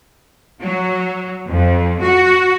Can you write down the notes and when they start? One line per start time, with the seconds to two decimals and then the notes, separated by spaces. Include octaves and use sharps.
0.60 F#3
1.48 F2
2.02 F#4